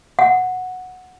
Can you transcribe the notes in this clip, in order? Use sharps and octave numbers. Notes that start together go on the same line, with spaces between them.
F#5